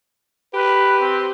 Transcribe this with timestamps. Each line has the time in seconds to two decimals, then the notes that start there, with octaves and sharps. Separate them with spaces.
0.54 G4 B4
1.00 C4